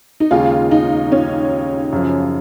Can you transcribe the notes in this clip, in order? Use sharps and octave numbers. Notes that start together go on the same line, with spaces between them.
D#4
D#2 C#3 G#3 F4
D#4
C#4
F#2 C#3 F3